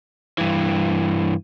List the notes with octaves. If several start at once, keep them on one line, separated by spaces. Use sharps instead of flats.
G2 E3